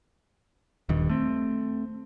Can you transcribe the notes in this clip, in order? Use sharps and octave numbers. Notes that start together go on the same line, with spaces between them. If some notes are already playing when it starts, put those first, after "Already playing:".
D#1 G2 D#3
A3 C4